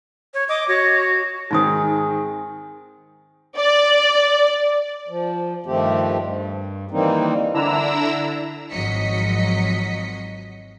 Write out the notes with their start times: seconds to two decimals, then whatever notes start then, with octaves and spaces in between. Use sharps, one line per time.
0.34 C#5
0.49 D#5 D6
0.68 F#4 C#5
1.51 G#2 D#3 C4 D#4 G#4 D#6
3.58 D5
5.08 F3
5.66 G2 D#3 F3 A3 C4 G4
6.17 G2
6.91 D#3 E3 G3 A#3 C4 D#4
7.54 D3 D4 E4 A#5 E6
8.71 G#1 F3 F#3 D#5 B6 C#7